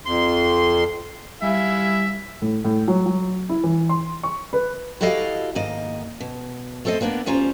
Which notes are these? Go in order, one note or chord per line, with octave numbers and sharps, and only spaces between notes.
F2 C6
G3 E4 E5 F5 G#5
A2
A2
F#3
F#3
E4
E3
C6
C#6
B4
E4 F#4 G4 A4 D#5 F5
G#2 D#3 A#3 D#5
B2
A3 C4 A4 C5 D#5
A#3 B3 D4 A#4
D2 G3 C#4 F4 C5 A#5